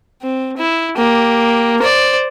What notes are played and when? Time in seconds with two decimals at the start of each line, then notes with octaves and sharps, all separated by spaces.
0.22 C4
0.57 E4
0.97 A#3 G4
1.81 C5 D5